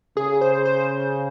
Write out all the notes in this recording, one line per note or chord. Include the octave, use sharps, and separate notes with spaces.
C#3 G#4
C5
C5